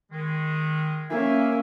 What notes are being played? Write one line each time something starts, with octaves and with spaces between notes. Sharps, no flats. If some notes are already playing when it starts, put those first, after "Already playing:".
D#3 G#3
A#3 C#4 E5 G#5